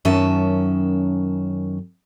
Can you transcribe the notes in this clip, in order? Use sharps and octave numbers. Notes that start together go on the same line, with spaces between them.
F#2 D#3 C#4 E5 A5